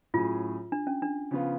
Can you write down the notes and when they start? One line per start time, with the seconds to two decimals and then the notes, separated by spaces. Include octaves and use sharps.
0.14 A2 F#3 C#4 F4 G#4
0.72 D4
0.87 C#4
1.02 D4
1.31 C#3 F3 B3 F4